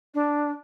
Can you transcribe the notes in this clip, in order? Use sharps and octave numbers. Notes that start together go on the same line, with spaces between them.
D4